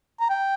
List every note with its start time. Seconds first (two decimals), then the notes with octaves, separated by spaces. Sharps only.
0.20 A#5
0.29 G5